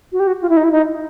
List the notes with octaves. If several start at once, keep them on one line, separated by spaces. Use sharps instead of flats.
F#4
G4
F#4
F4
E4
D#4
E4
D#4